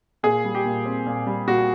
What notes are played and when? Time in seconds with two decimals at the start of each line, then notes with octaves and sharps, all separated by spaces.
0.23 A#2 G#4
0.44 G3
0.55 G4
0.65 A#2
0.85 C4
1.06 A#2
1.27 G3
1.48 A#2 F#4